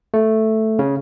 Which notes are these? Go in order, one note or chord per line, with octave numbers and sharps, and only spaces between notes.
A3
C#3